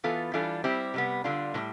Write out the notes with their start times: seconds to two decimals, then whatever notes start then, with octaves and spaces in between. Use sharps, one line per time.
0.04 E3 B3 F4 A4
0.33 E3 G3 D4 F4 A4
0.64 G3 C4 E4 G4
0.94 C3 G3 B3
1.24 D3 G3 D4 F4
1.54 A2 E3 G3